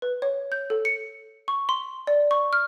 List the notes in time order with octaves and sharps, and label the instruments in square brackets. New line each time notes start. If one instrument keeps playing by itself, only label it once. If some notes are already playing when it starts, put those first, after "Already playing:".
[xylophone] B4
C#5
G6
A4
C#7
C#6
C6
D5
C#6
F6